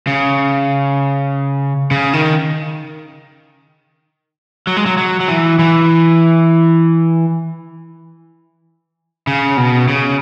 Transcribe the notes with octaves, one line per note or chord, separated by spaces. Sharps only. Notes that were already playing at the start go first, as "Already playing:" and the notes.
C#3
C#3
D#3
F#3
G#3
F#3
F#3
F#3
E3
E3
C#3
B2
C#3